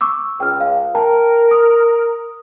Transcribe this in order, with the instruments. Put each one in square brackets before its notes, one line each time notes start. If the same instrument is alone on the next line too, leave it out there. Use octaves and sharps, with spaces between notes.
[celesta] C#6 D6 E6
[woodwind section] C#2 [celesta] G5 F6
[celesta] F5
[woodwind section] A#4 [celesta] G5 A5 A#5
[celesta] D#6